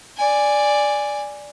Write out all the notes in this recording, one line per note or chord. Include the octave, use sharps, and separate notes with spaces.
D5 G#5